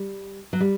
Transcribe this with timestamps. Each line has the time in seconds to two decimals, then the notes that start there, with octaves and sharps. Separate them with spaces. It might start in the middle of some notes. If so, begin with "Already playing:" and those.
Already playing: G3
0.53 F#3
0.60 G3